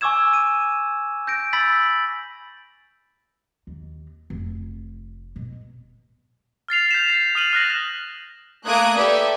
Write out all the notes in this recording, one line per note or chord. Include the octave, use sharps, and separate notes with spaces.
G#5 C#6 D6 E6 G#6 E7
D#7
G6 A#6 D7
B5 E6 A6 B6 F#7
D#2
F1
B2
F6 A6 C7 F7
G6 B6 E7
A6
D#6 F6 D#7 F#7
F6 F#6 A#6 F#7
A3 A#3 D#6 F#6 G#6 D7
G4 A4 B4 D5 E5